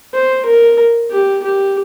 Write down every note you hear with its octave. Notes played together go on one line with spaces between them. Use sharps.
C5
A#4
G4
G4